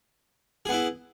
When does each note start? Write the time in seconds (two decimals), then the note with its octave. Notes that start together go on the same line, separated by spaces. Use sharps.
0.65 G#4
0.69 B3
0.72 E4